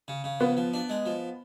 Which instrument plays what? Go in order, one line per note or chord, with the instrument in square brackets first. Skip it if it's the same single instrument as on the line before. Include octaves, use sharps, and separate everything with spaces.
[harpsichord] C#3
C#3
[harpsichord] F3 [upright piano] B3
[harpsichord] F3
D4
G#3
F3